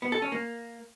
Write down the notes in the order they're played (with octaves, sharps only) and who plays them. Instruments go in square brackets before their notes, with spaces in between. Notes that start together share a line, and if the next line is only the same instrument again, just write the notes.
[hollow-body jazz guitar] B3
A4
C#4
A#3